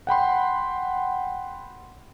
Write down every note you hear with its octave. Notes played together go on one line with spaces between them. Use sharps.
F#5 G5 B5 C6